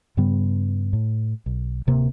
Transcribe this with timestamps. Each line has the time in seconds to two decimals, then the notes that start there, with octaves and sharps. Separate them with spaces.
0.17 G2 C#3 G3 B3
0.93 A2
1.46 B1
1.87 D1 C3 A#3